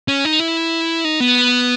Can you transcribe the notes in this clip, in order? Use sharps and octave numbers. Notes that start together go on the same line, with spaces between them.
C#4
D#4
E4
D#4
B3